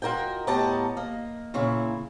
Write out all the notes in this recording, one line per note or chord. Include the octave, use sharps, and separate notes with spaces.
F4 F#4 A#4 D#5 G5
A2 B3 G4 D#5 A5 A#5
A#3 D#5
A#2 C#3 E4